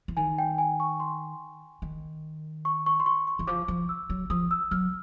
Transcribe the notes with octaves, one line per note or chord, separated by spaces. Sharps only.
E3
D#3 G#5
G5
G#5
C#6
C6
D#3
C#6
C#6
C6
C#6
C#6
E3
F3 D6
F3
E6
F#3
F3 D#6
E6
F#3 F6